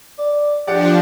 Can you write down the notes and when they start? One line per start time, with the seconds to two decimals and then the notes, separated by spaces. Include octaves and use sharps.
0.18 D5
0.67 F3 D4 G4 D5 F#5